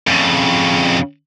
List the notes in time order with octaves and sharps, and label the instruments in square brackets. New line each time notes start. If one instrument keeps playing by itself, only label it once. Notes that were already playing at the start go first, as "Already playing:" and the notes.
[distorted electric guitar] F2 C#3